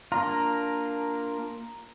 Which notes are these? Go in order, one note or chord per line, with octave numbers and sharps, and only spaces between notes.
A#3 D4 F4 A#5